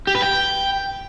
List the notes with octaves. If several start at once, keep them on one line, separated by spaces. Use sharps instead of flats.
G4
B4
G5